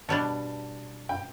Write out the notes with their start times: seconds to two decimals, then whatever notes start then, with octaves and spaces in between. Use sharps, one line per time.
0.09 B2 G3 D4 A5
1.09 G5